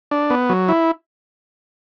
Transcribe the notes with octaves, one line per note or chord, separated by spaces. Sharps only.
D4
B3
F#3
E4